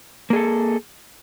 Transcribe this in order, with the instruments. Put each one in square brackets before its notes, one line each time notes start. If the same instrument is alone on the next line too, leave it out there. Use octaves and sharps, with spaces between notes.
[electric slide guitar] A#3
G#4
A4